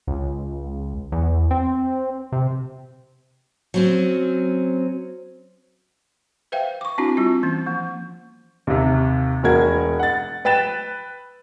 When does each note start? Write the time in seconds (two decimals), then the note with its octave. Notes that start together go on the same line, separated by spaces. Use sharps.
0.07 C#2
1.12 E2
1.51 C4
2.32 C3
3.74 F#3 C4 C#4
6.52 B4 C5 E5 F5 G5
6.81 C#6 D6
6.98 C4 D4 E4 F#4
7.17 G3 C4 F4
7.43 E3 A#3 C#4
7.66 F3 A#3
8.67 D#2 C3
9.43 E1 B2 F#4 A#4 G#6
9.99 F#5 A6
10.45 B4 G5 A6 E7